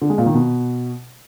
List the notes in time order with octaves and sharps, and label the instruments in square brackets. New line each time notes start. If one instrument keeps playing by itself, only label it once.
[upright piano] D3
G#3
A#2
D#3
B2